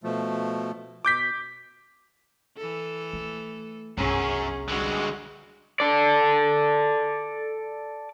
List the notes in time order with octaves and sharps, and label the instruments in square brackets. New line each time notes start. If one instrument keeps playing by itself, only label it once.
[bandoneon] B2 F3 A3
[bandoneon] B2 [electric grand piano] D6 G6 B6
[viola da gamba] E3 A4
[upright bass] A3
[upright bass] G1 C2 [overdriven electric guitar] F#2 [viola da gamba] C#4 G#4
[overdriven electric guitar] D3 G#3 [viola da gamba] G3 F#4
[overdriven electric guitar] A4 D5